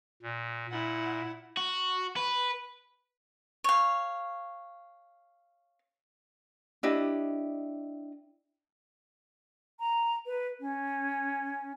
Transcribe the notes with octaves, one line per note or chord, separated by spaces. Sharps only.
A#2
A#2 E4 F#5
F#4
B4
C#5 F5
D4 E4 G4 D#5
A#5
B4
C#4